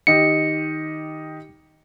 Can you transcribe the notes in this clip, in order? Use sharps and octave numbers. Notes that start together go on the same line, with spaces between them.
D#3 G4 D#5 C#7